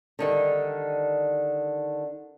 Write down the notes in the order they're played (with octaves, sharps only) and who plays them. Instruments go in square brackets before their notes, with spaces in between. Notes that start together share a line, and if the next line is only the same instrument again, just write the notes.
[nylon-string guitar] D3 D#3 G3